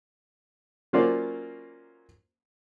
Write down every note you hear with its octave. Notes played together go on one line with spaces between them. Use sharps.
F#3 A#3 C#4 F4 C5 D5